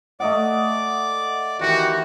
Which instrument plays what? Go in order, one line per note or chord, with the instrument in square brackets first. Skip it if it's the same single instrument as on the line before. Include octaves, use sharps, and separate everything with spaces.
[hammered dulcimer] A3 D#5 F#5 [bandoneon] D5 D6
[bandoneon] D#3 G4 [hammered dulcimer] E3 [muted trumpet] F#4